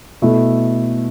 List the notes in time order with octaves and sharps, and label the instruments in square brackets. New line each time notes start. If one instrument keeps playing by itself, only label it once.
[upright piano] B2 A3 E4 A4